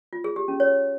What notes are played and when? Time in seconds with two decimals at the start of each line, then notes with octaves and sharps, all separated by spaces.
0.13 F4
0.24 G#4
0.36 G4
0.48 C#4
0.60 C#5